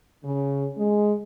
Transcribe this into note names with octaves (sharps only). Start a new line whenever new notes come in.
C#3
G#3